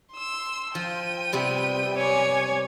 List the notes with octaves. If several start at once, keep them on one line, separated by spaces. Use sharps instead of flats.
C6 E6
F3 G5 D#7
C3 G3 B3
C#5 G#5 D6